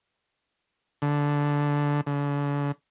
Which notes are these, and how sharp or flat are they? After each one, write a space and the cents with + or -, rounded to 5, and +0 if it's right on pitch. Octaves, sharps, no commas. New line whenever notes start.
D3 -10
D3 -40